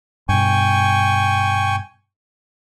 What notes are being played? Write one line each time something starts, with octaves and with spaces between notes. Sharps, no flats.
G2 B2 G5 G#5 C#6